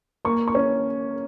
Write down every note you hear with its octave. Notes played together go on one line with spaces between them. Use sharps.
A#3 C#6
C#6
C#4